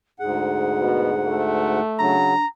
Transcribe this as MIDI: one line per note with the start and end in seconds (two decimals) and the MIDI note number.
0.20 1.80 38
0.20 1.80 44
0.20 1.81 68
0.20 1.80 78
0.81 1.11 47
1.27 2.15 57
1.99 2.34 49
1.99 2.34 54
1.99 2.43 62
1.99 2.47 82